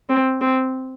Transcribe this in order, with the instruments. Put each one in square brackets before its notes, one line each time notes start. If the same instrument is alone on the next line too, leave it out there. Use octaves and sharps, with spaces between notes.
[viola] C4
C4